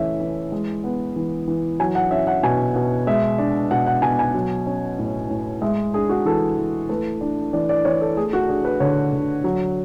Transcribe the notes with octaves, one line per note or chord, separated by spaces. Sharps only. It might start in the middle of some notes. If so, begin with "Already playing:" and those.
Already playing: E3 A3 C#4 E5
E3
G#3
B3
E3
E3
F#3 G#5
F#5
C#4 E5
F#5
B2 G#5
B2
G#3 E5
D4
B2 F#5
F#5
B2 G#5
G#5
F#3
C#4
A2
A2
G#3 E5
D4 G#4
F#4
E3 A4
E3
A3 B4
D4
E3 D5
D5
E3 C#5
A4
A3 G#4
F#4
D4 G#4
B4
D3 C#5
D3
F#3